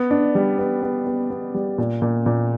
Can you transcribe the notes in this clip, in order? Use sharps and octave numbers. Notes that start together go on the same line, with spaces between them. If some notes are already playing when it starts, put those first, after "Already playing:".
Already playing: B3
D4
G3
B3
B3
B3
B3
G3
A#2
A#2
A#2